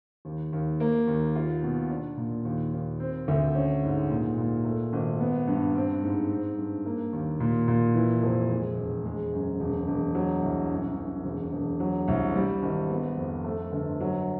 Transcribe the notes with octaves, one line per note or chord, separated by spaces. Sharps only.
D#2
D#2
A#3
D#2
F4
B2
D4
A#2
D#2
D#2
C4
D2
C#4
G#2
A#2
A#2
A3
G#1
B3
G2
C4
G#2
C4
G2
A#3
D#2
A#2
A#2
E3
F1
G#3
E1
G#3
F#2
E1
E1
F#3
C2
F#2
F#2
E1
E1
F#3
C2
G3
G#1
B3
F2
A3
G1
F#3